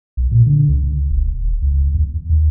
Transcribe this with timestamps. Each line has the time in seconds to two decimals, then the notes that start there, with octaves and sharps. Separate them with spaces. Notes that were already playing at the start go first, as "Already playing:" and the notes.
0.17 B1
0.31 A#2
0.46 D3
0.69 C#2
0.84 C#2
1.11 E1
1.27 D#1
1.62 C#2
1.95 E2
2.30 D#2